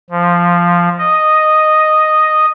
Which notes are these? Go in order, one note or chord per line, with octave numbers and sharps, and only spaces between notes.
F3
D#5